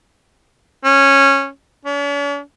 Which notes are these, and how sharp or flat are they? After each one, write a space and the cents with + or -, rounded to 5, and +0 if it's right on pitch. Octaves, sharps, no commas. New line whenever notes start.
C#4 -10
C#4 +45